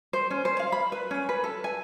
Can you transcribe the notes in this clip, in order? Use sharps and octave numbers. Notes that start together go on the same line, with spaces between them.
C5
C#4
C5
F5
B5
B4
C#4
B4
A4
G#5